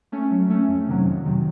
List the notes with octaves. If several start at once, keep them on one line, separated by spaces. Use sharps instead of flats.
A3 C#4
F#3
A3 C#4
F2
C3 D#3 F#3
F2
C3 D#3 F#3